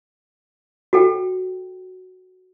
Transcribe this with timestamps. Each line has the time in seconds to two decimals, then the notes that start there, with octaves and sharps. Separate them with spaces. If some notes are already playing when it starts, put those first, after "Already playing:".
0.93 F#4 A4 G5